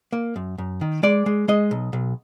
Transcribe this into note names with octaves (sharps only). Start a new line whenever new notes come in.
A#3
F#2
F#2
D#3
G#3 D5
G#3
G#3 D#5
B1
B1